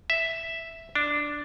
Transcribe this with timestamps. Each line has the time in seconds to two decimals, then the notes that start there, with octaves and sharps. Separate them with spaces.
0.10 E5
0.95 D4